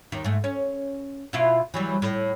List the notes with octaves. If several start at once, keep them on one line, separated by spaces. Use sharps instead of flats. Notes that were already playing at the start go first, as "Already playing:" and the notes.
D#2 D#3
G#2 A3
C#4
B2 E4 F4
E3 F#3 G3
A2